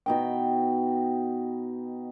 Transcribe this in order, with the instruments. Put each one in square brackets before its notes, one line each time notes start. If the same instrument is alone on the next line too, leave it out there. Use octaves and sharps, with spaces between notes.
[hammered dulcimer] B2 D#4 G5